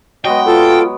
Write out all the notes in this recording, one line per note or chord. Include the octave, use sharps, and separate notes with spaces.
F#3 G#3 B3 D#5 G5
F4 A4